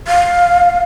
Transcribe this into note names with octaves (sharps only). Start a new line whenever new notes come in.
F5